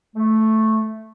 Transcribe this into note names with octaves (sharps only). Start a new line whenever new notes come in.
A3